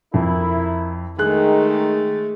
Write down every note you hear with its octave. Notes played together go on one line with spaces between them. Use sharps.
F2 E4 A#4
D#3 G#3 A3 G#4 F#6